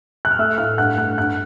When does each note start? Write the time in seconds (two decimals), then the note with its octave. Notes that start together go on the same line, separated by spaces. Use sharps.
0.25 F#6
0.31 F6
0.39 A3 E5 E6
0.58 A2 F5 F6
0.77 G2 F#5 F#6
0.97 A3 F#5 F#6
1.17 G2 F#5 F#6